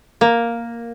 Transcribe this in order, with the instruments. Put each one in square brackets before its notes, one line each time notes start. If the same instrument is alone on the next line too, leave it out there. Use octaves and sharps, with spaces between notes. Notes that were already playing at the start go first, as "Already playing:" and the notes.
[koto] A#3